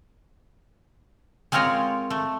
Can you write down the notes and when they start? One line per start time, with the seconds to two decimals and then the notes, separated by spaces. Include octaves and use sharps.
1.52 G#3 C4 F4 A#4 C#5 G#5
2.10 A3